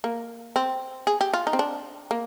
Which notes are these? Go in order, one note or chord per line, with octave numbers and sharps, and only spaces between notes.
A#3
C4
G#4
G4
F4
D#4
C4
D4
A#3